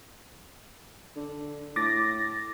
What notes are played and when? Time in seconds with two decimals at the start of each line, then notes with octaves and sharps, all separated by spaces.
1.16 D3
1.76 A2 D6 A6 A#6